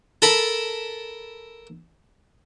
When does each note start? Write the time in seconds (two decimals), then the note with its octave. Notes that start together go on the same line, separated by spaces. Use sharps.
0.22 A4 A#4 A5 B5